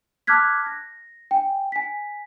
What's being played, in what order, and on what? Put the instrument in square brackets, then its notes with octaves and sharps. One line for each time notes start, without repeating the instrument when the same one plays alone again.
[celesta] A5 D6 F6 F#6 G#6 B6
A#6
G5 G#5
G#5 B6